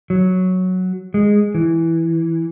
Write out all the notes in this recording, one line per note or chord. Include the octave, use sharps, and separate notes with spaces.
F#3
G#3
E3